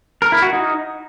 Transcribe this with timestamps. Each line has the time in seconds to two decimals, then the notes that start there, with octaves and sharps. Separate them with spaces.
0.22 A#4
0.32 E4
0.42 F#4
0.53 D#4